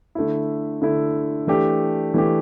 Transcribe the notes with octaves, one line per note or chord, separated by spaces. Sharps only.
D3 A3 E4
D3 A3 E4
E3 A3 D4 G4
E3 A3 D4 G4